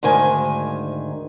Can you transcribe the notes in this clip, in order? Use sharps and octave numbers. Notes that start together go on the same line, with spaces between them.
D2 G#2 D#3 G#5